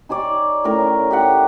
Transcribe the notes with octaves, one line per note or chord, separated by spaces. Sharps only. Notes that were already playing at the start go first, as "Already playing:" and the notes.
D#4 G#4 C#5 D5
A2 C#4 A#4 A#5
G4 E5 F#5 C6